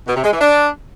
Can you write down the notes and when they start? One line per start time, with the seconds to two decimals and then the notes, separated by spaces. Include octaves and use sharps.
0.07 B2
0.16 C3
0.24 G#3
0.32 E3
0.40 D4